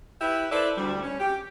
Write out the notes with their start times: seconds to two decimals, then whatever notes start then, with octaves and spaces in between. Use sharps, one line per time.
0.21 E4 G4 B4 E5
0.52 E4 A4 B4 C5 D5 E5
0.77 D2 G3
1.03 C#4
1.20 G4